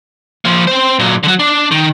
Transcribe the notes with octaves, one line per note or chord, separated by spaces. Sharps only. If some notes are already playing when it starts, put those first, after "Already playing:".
F3 A#3
C4 C5
A#2 F#3
D3 F#3
D4
D#3